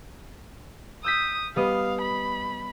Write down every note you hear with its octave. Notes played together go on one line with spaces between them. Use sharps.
D#6 E6 G6 B6
G3 B3 D#5 F5
B5